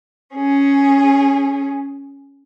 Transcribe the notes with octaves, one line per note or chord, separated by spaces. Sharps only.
C#4 G#4